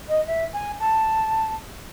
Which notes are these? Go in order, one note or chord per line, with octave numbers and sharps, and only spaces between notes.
D#5
E5
G#5
A5